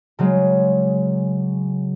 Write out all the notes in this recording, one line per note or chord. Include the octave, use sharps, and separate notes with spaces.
C#3 F#3 G#3